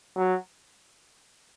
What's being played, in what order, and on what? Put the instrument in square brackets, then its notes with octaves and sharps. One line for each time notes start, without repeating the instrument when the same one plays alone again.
[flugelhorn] F#3